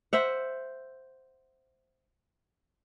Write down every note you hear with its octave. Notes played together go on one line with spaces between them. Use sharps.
C5 E5 F#5